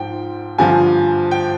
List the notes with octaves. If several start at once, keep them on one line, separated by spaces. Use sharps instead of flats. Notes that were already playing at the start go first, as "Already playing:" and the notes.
Already playing: G#2 F3 G5
G2 D3 F3 G#5
G5